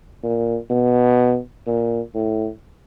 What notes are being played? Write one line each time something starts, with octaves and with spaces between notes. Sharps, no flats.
A#2
B2
A#2
A2